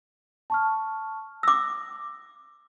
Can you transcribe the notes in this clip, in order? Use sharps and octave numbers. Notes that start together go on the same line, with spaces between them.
A5 C#6 F6
D6 E6 A#6